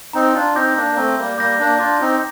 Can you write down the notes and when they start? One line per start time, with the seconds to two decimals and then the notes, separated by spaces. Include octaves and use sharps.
0.13 C4 D#4 A#5
0.34 D4 F4
0.55 C4 D#4 D6 G6 A#6
0.76 A#3 D4
0.90 A#3
0.96 A3 C4 A#5
1.18 G3 A#3
1.38 G3 A#3 D6 G6 A#6
1.59 A#3 D4
1.79 D4 F4 D6
2.01 C4 D#4